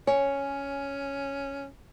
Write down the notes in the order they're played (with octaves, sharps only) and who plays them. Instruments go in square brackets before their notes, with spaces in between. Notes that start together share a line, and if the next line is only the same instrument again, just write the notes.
[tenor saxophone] C#4 [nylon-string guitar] C#5 [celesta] G#5